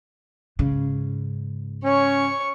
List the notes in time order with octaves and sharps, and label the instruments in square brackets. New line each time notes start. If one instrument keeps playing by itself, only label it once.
[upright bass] G#2 C#3
[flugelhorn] C#4 [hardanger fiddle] C#5 C#6